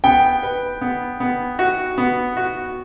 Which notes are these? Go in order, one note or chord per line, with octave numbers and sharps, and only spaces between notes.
B3 G5
B4
B3
B3
F#4
B3
F#4